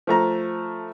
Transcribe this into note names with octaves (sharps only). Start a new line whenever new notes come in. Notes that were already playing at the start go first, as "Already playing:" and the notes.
F3 A3 A#5